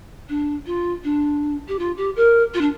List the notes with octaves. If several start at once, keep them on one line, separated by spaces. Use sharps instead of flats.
D4
F4
D4
G4
F4
G4
A#4
F4
D4